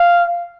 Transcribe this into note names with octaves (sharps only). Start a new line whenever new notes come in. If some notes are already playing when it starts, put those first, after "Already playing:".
Already playing: F5